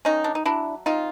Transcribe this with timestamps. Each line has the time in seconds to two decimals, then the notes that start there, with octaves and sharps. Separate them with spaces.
0.05 D#3 C#4 D#4
0.24 D4
0.35 D#4
0.45 F#3 D4 E4
0.86 C4 D#4 F4